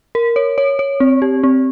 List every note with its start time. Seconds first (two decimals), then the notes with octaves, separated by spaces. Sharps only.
0.15 A#4
0.36 C#5
0.58 C#5
0.79 C#5
1.00 C4
1.22 G4
1.43 C4